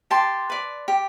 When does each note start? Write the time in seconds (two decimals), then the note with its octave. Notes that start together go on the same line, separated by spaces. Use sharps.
0.11 G4 A5 C6
0.50 B4 D5
0.88 G4